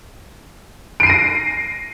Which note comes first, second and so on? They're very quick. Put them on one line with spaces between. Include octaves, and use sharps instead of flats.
D7 C7 D#7 A#6